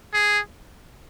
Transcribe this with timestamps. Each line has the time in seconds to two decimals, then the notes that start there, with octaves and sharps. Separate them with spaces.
0.14 G#4